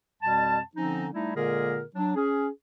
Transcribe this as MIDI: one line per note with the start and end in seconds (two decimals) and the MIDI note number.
0.22 0.59 41
0.22 0.59 47
0.22 0.59 55
0.22 0.59 81
0.75 1.07 50
0.75 1.07 53
0.75 1.07 60
0.75 1.07 61
0.75 1.07 63
1.13 1.31 55
1.13 1.31 57
1.13 1.31 63
1.13 1.31 64
1.35 1.82 46
1.35 1.82 50
1.35 1.82 56
1.35 1.82 58
1.35 1.82 68
1.35 1.82 70
1.95 2.12 54
1.95 2.12 62
2.15 2.47 61
2.15 2.47 68